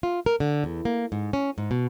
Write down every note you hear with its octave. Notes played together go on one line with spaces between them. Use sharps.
F4
A#4
D3
E2
A#3
G#2
C#4
G#2
B2